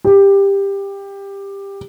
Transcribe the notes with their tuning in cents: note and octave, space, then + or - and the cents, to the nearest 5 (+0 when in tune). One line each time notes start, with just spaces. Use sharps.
G4 +15